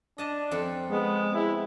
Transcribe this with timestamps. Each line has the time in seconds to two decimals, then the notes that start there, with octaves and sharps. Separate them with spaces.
0.18 D4 D#5 A5
0.51 F2 A4
0.90 G#3 B3
1.33 E4